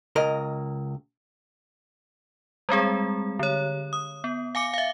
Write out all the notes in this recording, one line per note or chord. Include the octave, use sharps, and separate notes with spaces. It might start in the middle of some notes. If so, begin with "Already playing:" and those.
C#2 A#4 D#5
G3 G#3 C4 G#4
D3 C#5
D#6
B3
F5 G#5 D6 C#7
E5 F5